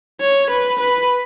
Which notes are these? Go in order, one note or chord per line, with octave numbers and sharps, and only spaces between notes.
C#5
B4
B4